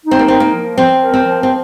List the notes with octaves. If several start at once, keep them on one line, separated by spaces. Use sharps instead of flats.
D#4
C4
A#3
C4 A#4
A#3
F3
F3 C4
A#4
C4
F3
C4